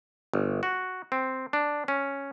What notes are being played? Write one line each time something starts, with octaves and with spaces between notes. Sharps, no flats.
G1
F#4
C4
D4
C#4